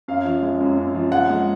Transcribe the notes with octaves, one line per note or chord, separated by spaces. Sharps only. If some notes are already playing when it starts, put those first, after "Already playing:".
F#2 F5
F3
G#3
F#2
F#2
F3
G#3 F#5
G#3